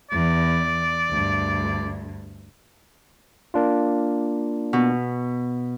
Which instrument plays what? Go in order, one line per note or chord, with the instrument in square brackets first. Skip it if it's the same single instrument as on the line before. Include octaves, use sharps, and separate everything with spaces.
[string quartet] E2 [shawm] D5
[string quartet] D2 G2
[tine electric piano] A#3 D4 F4
[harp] B2